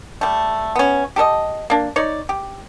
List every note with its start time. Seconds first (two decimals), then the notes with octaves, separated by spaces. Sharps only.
0.21 G3 A3
0.76 B3 C#4
1.16 G4 A4 A#4 D#5
1.70 A#3 D4
1.96 D#4 C#5 D5
2.29 G4